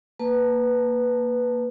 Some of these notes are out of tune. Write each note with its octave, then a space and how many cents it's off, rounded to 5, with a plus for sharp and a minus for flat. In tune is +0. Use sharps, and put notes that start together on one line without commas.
A#3 +0 B4 +0 A5 +0